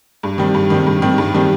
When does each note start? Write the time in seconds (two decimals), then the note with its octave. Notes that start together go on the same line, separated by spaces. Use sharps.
0.23 G2
0.38 D#3 G3 C4
0.54 G2
0.70 D#3 G3 C4
0.87 G2
1.02 D#3 G3 C4
1.18 G2
1.34 D#3 G3 C4